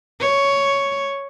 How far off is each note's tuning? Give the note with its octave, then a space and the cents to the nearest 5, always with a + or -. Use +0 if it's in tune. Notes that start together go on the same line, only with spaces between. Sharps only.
C#5 +5